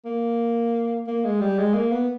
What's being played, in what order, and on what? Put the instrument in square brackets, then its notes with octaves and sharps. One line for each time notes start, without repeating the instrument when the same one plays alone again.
[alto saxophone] A#3
A#3
G#3
G3
G#3
A#3
B3